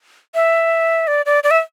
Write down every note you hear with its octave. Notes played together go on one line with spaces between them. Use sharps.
E5
D5
D5
D5
E5